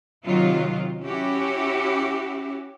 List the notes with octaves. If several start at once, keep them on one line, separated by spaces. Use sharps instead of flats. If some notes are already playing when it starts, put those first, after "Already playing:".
C3 D#3 F#3 F4
C#4 E4 F#4 G4